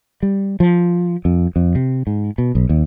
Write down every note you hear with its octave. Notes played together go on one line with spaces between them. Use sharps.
G3
F3
F2
F2
C3
G#2
B2
B1
D#2